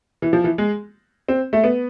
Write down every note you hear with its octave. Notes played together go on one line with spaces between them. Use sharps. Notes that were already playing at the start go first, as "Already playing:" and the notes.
E3
F3
E3
G#3
C4
A3
B3